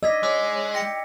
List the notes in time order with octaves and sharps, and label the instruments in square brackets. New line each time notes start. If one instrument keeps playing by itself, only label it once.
[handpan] D5 D#5 [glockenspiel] E6 G#6 B6
[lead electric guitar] G#3 [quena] C#5 [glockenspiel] D6 E6 B6
[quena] G5 [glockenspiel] A#6 C#7